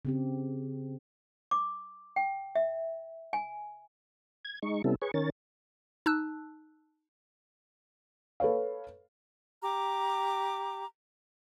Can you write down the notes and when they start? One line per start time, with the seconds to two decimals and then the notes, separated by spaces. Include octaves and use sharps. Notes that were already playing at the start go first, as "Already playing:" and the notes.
0.05 C#3 C4 G4
1.51 D6
2.16 G5
2.55 E5
3.33 G#5
4.45 G#6
4.62 G#3 D#4 C#6
4.84 C3 G3 B3 C#4 E4 A4
5.02 G#4 B4 C#5 C#6
5.14 D#3 C#4 A#4 C#5 A6
6.06 D#4 A5 E6 F#6
8.40 A4 B4 C#5 F5
9.63 G4 A#5 D6